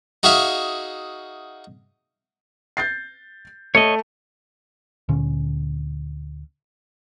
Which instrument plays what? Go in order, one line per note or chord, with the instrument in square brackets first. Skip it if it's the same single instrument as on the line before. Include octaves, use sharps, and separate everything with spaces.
[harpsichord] D#4 F#4 G#4 E5 F5 C#6
[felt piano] G6 A6 C7
[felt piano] A3 [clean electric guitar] C#5 D#5
[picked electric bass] D2 A#2 D3 C#4